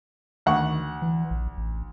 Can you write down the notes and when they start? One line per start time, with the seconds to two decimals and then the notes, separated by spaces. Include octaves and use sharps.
0.46 D2 D#3 F#5 C#6
1.02 E3
1.30 A#1
1.57 A1